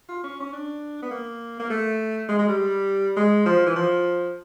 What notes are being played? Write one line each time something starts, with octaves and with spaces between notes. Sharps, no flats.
F4
C#4
C#4
D4
B3
A#3
A#3
A3
G#3
G#3
G3
G#3
F3
E3
F3